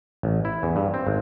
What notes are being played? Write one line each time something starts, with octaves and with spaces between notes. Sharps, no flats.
A1
E4
E2
G2
C4
G#1